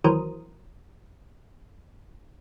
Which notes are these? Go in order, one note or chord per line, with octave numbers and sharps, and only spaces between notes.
D#2 E3 F#3 A#4 C5 D#6